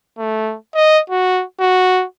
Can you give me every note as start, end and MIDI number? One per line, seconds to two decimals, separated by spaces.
0.18 0.56 57
0.75 1.00 75
1.10 1.44 66
1.60 2.05 66